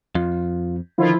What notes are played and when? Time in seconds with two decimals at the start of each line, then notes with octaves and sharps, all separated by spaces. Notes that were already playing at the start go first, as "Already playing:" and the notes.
0.15 F2 F4
0.98 D3 D#3 F3 E4 F4